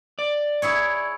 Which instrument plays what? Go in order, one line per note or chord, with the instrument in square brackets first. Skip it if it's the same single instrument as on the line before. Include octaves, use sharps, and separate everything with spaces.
[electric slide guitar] D5
[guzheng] E4 G#4 C#5